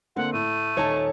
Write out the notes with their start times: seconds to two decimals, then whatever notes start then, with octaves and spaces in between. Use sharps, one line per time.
0.16 D3 A#3 C4 F#5
0.33 A2 A3 D#7
0.77 D#1 D#4 A4 C#5 A5